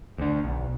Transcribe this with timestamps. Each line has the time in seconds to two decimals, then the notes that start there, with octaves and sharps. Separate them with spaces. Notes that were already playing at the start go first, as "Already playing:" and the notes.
0.18 D2 D3
0.44 B1